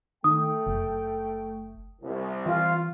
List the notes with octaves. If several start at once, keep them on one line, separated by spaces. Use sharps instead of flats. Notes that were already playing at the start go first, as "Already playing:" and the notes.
D#3 A3 G5 D#6
F#1
C2
E3 F4